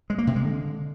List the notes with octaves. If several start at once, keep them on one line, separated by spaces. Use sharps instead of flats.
G#3
A#3
C3
G#3
D3